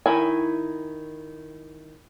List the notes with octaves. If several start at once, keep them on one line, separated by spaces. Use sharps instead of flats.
D#3 E4 G#5